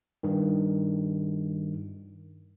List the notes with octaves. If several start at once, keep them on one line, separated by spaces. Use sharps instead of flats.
G2 D#3